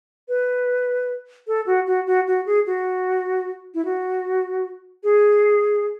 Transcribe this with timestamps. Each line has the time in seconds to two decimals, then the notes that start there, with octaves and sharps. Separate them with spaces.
0.28 B4
1.47 A4
1.66 F#4
1.87 F#4
2.06 F#4
2.27 F#4
2.46 G#4
2.67 F#4
3.74 E4
3.85 F#4
5.04 G#4